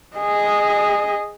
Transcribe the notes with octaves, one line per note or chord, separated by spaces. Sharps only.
G#4 D#5